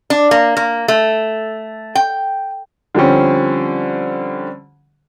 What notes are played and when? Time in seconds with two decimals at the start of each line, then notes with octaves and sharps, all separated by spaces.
0.10 D4
0.31 A#3
0.57 A#3
0.88 A3
1.95 G5
2.95 D3 F3 G3 C4 C#4